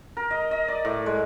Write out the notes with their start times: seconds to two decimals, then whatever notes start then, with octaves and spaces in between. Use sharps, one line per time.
0.17 A#4
0.31 D#5
0.51 D#5
0.68 D5
0.85 A2
1.06 G#3